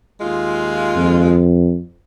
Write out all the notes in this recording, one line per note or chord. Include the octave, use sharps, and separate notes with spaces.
D#2 G#3 F4
F2